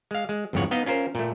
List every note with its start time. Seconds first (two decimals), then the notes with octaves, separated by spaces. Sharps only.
0.11 G#3 F5
0.29 G#3
0.53 G1 F2 A2 C#3 C#5 F#5
0.71 B3 D#4 D#5 F5
0.86 C#4 F4 A#4 C5
1.15 A#2 A3